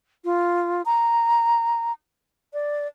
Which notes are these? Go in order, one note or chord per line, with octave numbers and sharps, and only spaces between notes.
F4
A#5
D5